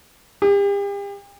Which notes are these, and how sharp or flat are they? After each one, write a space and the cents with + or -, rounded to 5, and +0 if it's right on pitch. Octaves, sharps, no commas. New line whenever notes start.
G4 +40